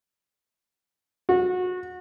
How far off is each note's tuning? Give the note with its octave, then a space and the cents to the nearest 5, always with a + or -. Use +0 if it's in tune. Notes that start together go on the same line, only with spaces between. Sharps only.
F#4 -25